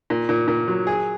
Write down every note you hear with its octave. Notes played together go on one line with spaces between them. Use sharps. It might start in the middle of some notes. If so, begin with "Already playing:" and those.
A#2
A#2
A#2
F#3
G#4